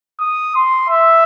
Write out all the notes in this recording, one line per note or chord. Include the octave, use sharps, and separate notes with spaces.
D#6
C6
E5